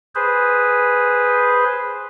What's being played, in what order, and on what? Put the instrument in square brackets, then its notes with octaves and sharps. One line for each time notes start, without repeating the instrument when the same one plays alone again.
[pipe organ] G#4 B4 C5